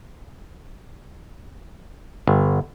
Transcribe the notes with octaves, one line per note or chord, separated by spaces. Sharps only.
G1